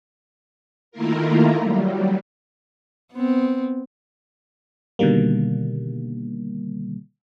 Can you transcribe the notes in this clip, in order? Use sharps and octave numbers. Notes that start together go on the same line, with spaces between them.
D#3 A3 A#3 E4 F4 A#4
F#3 G3
B3 C4
B2 D3 D#3 G3 A#3